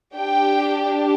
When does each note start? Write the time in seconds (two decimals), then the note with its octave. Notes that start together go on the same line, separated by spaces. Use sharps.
0.15 D4 G4 G5